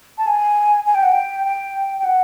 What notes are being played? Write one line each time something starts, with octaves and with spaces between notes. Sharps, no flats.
A5
G#5
G#5
G5
F#5
G5
G5
G5
F#5